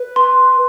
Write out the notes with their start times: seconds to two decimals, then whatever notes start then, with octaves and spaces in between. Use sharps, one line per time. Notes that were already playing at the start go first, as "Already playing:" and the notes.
Already playing: B4
0.16 C6